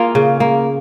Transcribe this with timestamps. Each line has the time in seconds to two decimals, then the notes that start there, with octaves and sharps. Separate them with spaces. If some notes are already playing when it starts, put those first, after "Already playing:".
Already playing: A#3 F4 G#4
0.15 C#3
0.40 A#3